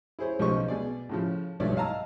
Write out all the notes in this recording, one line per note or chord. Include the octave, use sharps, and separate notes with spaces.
E4 G#4 C5 C#5
B1 C#3 F3 C5 D#5 C#6
B2 G#4 D5
A2 C#3 F3
B1 G2 F3 C#5 D5 E5
D#5 F5 A5 A#5 E6